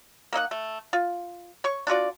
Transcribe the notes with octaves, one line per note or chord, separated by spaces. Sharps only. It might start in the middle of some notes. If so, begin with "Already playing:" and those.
A#3 D#4 D#5 F#5
A3
F4
C#5 C#6
D4 F4 F#4 D5